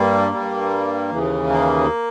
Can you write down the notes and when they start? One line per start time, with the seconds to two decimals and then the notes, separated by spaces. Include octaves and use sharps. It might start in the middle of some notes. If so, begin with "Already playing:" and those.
Already playing: G2 G3 A#3
0.32 G2 G3
1.11 D#2 C#3 E3
1.50 A#3